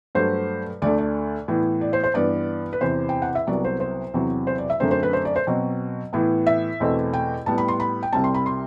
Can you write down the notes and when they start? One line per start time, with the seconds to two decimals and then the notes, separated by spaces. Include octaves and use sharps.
0.15 G2 F#3 A3 C5
0.82 D2 D3 A3 D5
0.98 D5
1.48 A2 E3 B3
1.81 D5
1.93 C5
2.04 C5
2.14 G2 E3 B3 D5
2.73 B4
2.81 E2 C3 E3 C5
3.09 G5
3.22 F#5
3.35 E5
3.47 C2 C3 F#3 B3 D5
3.65 C5
3.80 C5
4.14 E2 C3 F#3 C4
4.47 C5
4.58 D5
4.70 E5
4.80 F#2 D3 A3 C4 C5
4.91 C5
5.03 B4
5.13 C5
5.25 D5
5.36 C5
5.47 B2 F#3 C4
6.13 A2 E3 B3
6.47 E5
6.80 E2 B2 A3 C4
7.13 G5
7.46 A2 G3 B3 A5
7.58 B5
7.68 C6
7.80 B5
8.03 G5
8.13 C2 C3 G3 C4 A5
8.24 C6
8.34 B5
8.46 C6